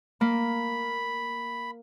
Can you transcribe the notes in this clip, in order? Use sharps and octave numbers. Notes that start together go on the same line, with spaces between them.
A#3 B5